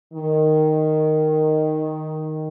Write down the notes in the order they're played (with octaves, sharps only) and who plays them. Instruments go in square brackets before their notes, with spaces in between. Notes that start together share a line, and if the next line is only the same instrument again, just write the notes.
[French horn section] D#3